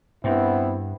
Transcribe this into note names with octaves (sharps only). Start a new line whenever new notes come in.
G2 B3 C4 E4